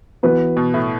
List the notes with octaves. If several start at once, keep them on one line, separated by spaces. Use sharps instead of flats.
E3 B3 F#4 B4
B2
A2